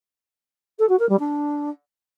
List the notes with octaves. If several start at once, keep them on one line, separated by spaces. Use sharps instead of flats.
A4
F#4
A#4
G3
D4